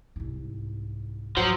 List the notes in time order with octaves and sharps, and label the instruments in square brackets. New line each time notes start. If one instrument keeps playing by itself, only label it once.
[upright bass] C2 G#2
[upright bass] G#2 [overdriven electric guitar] F3 [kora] F#3